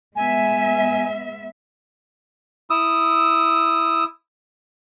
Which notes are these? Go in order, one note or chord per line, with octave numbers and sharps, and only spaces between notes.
G#3 B3 E5 G#5
E4 D#6 E6